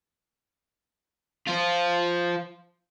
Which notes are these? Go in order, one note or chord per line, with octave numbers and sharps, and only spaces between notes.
F4 C5